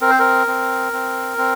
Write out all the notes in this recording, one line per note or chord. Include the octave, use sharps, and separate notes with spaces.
C4 A#4
C5
A#4
C4
C4
C4